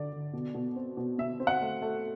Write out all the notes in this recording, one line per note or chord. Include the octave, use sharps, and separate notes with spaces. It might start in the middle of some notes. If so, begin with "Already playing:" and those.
Already playing: D3 D5
D3
B2
B2
C4
B2
B2 E5
C4
F#5
A3
A3